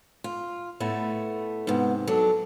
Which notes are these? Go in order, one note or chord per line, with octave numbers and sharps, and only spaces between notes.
F4
A2 A3 B3
G#2 C3 B3
F#3 D4 A4